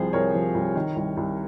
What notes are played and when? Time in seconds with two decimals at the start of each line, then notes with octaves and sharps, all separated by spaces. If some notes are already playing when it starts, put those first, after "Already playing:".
Already playing: C2 C3 F3 G#4 C5
0.13 C2 A#4 C#5
0.35 F3
0.54 C2
0.75 D#3
0.96 C2
1.17 C2